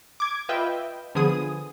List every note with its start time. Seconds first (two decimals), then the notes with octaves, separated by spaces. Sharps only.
0.20 D6 G#6
0.49 F4 B4 D#5 E5 G5
1.15 D3 F3 B3 G#4 D#6